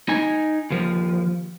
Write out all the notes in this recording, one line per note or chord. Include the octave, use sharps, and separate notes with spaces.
D#4 G#5
D#2 F3